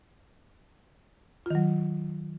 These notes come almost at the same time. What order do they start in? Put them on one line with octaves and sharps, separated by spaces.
F4 D#3 F#3